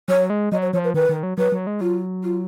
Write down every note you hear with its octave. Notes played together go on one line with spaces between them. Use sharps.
F#3 C#5
G#3
F#3 D#5
C#5
F3 C#5
B4
D#3 B4
D#3
F#3
F#3 B4
F#3
G#3
F#3 F4
F4